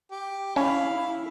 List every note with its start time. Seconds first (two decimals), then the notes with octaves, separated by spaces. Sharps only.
0.11 G4
0.56 C#4 E4 F5 B5
0.92 E4